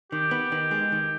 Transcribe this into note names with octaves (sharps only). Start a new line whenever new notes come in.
D#3 G4
B3
D#3
G#3
D#3